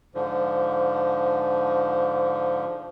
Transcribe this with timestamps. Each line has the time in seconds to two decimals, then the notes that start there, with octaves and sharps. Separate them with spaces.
0.15 G#2 D3 F3